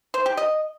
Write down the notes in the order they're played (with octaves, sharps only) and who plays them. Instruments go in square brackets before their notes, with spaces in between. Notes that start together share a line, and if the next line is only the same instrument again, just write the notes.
[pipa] C5
G4
D#5